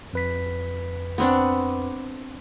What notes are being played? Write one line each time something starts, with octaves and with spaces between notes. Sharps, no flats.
F2 B4 B6
B3 C4 D4